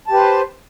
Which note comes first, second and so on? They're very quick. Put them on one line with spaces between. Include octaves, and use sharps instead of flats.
A5 G4 B4 C5